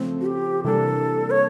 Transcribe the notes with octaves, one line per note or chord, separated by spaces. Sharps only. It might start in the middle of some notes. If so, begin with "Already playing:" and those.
Already playing: C#3 F3 A3 C4
F#4
G4
C3 E3 G3 A#3 D4 A4
C#5